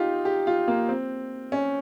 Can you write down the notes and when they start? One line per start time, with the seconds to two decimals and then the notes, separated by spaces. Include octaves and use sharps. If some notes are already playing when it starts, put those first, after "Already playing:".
Already playing: D#4 F4 G4
0.25 G4
0.47 F4
0.68 A#3
0.89 C4
1.52 C#4